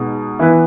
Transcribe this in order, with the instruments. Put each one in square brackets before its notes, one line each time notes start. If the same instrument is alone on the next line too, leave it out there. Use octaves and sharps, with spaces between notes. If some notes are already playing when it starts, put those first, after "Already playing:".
Already playing: [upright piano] B2 G#3 D#4
E3 B3 E4 B4